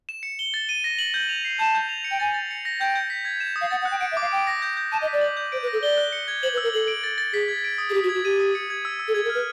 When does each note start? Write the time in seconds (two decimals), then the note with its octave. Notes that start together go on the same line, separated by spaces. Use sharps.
0.09 E7
0.23 C#7
0.39 G7
0.54 A6
0.69 D#7
0.84 A#6
0.99 F#7
1.14 G6
1.29 F7
1.45 C7
1.59 A5 G6
1.75 G6
1.89 F7
2.04 C#7
2.11 G5
2.20 G#5 A6
2.34 A6
2.51 C#7
2.65 A#6
2.80 G5 G6
2.95 G6
3.10 B6
3.25 G#6
3.40 E7
3.56 D#6
3.61 F5
3.71 F#5 A6
3.82 F#5
3.85 F#6
3.91 G5
4.01 F#5 D7
4.11 E5
4.17 F5 D6
4.31 G5 D7
4.47 A#6
4.62 G6
4.77 G6
4.92 A5 D#7
5.02 D#5
5.07 B6
5.12 D5
5.21 F#7
5.37 G6
5.52 C5 D7
5.62 B4
5.67 A#6
5.73 A4
5.82 D5 G7
5.97 F#6
6.12 C#7
6.28 G#6
6.43 C5 F#7
6.53 B4
6.57 E6
6.63 A#4
6.73 A4 F#7
6.88 D7
7.04 A6
7.18 A6
7.33 G#4 B6
7.48 G#6
7.64 D7
7.78 D#6
7.90 G#4
7.94 G4 B6
8.04 F#4
8.09 G#6
8.14 F#4
8.24 G4 D#7
8.40 D#6
8.55 C#7
8.70 G#6
8.85 E6
8.99 E6
9.08 A4
9.14 G#4 G#6
9.24 A#4
9.29 F6
9.34 B4